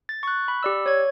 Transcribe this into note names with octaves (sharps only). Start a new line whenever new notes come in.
A6
C#6 F#6
B5
G4 D5 E6
C#5 G#6